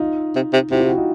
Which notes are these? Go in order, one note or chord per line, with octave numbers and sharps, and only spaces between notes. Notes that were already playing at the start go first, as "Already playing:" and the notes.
Already playing: D#4 F4
C3
C3
C3 E4 F#4
F4 G4
E4 F#4
D#4 F4